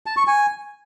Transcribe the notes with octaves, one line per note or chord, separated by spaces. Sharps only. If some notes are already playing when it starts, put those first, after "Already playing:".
A5
C#6
G#5